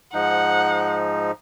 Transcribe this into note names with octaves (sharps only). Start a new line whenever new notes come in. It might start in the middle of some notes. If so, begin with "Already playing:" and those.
G#2 F3 D#4 F#5